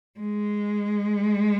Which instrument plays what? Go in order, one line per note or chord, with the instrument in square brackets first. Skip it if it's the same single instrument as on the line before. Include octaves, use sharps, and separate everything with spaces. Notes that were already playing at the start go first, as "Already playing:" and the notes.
[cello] G#3